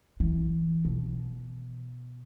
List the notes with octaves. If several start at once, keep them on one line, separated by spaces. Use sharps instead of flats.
E3
B2